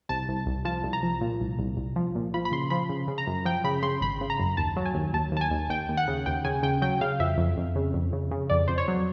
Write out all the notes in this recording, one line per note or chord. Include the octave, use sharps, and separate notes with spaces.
C2 A5
C2
C2
F3 A5
C2
A#5
F3
A#2
C2
C2
C2
F3
A#2
F3 B5
B5
C#3 C6
F3 B5
C#3
C#3
A#5
F#2
F3 G5
C#3 B5
C#3 C6
G#1 B5
C#3
A#5
F#2
D#2 A5
F#3
G#5
D#2
D#2 A5
D#2 A5
G#5
D#2
D#2 G5
D#2
F#5
C#3
D#2 G5
C#3 G#5
C#3 G5
F#3 G5
C#3 F5
F2 E5
F2
F2
C#3
F2
C#3
C#3
F2 D5
F2 C5
C#5
F#3